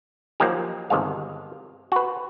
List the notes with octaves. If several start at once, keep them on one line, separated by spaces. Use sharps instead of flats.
F3 F#3 A#3 D#4 G4
G1 C3 D#3 G#3 F5
F#4 B4